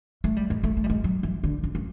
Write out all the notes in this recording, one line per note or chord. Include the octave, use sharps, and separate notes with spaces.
A3
G3
G#3
A3
A3
G3
G#3
F#3
E3
D3
C#3
C#3